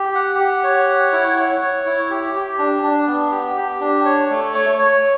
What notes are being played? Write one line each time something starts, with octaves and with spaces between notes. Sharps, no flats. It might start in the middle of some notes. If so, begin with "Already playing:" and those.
Already playing: G4
F#5
G4
C#5
F#5
E4
C#5
C#5
E4
G4
G4
D4
D4
B3
G4
G4
D4
C#5
A3
C#5
C#5